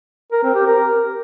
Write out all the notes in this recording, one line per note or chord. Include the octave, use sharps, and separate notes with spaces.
A#4
C4
G4
A#4